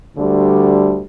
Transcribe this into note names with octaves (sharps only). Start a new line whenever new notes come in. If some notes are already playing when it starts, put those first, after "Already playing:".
D2 D3 G3